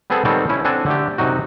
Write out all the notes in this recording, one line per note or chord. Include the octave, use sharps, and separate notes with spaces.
G3 B3 C4 G#4 A4
D#3 G3 B3 C4 A4 C#5
C#4 E4
C4 D4 A4 F#5 G#5 A5
D3 A3 G4
F#2 C3 F#3 D#4 F#4